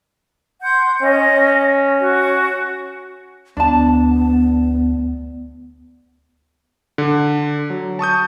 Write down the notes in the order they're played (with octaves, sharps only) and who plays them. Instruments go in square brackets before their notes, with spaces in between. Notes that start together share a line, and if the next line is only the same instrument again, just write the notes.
[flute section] F#5 C6 G6
[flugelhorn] C#4 [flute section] D#5
[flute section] F#4
[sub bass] D2 [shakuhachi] B3 [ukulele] D4 A5
[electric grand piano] D3
F#3
A5 C#6 D#6 G6